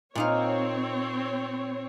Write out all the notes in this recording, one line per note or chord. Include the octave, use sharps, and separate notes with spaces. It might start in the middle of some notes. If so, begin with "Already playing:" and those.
A#2 C4 D#4 C#5 F5